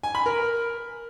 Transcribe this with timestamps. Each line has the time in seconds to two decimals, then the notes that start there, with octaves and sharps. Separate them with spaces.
0.03 G#5
0.15 B5
0.26 A#4